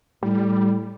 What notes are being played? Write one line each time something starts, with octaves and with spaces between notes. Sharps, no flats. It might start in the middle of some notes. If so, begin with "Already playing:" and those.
A2 G3